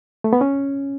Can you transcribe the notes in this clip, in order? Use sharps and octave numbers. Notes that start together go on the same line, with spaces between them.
A3
B3
C#4